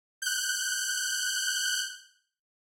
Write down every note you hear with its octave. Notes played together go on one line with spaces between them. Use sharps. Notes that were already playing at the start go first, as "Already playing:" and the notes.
F#6 G6